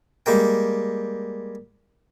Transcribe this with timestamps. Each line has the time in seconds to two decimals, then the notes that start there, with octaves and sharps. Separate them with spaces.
0.26 G3 G#3 A#3 G5